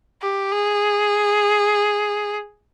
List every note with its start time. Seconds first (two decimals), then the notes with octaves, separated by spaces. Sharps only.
0.22 G4
0.52 G#4